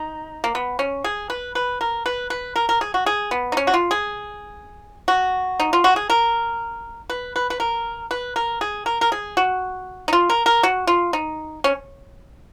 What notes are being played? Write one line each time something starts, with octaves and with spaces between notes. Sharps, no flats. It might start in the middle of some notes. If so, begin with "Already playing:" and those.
Already playing: D#4
A#3
B3
C#4
G#4
B4
B4
A#4
B4
B4
A#4
A#4
G#4
F#4
G#4
B3
D#4
C#4
F#4
F4
G#4
F#4
D#4
F4
F#4
G#4
A#4
B4
B4
B4
A#4
B4
A#4
G#4
A#4
A#4
G#4
F#4
D#4
F4
A#4
A#4
F#4
F4
D#4
C#4